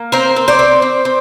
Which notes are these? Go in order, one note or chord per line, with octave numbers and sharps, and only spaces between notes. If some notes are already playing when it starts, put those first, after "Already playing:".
Already playing: A#3
C4 A#4 C5
C4
C5 D5
C4
C4
C4